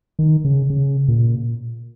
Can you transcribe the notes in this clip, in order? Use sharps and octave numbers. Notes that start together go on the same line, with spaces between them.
D#3
C#3
C#3
A#2